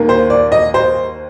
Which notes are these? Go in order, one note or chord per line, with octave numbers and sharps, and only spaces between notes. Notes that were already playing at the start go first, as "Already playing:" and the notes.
Already playing: D#2 D#3 A#3
C5
D5
D#5
C5